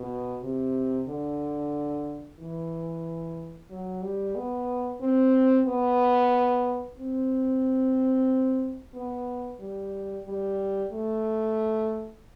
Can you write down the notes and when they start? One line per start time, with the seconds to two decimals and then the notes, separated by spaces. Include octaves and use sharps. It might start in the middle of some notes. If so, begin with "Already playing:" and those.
Already playing: B2
0.42 C3
1.08 D3
2.39 E3
3.70 F#3
4.03 G3
4.36 B3
5.01 C4
5.67 B3
6.98 C4
8.94 B3
9.60 G3
10.26 G3
10.92 A3